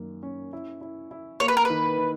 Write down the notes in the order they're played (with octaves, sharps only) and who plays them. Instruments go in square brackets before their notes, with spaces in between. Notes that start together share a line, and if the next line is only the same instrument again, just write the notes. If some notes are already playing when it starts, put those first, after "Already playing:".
Already playing: [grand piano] F#2 D#3 A#3
C#4
E4
E4
E4
[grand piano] A#3 [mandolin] C#5
[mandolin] B4
A#4
[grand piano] D#3 [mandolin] B4
[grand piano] D#3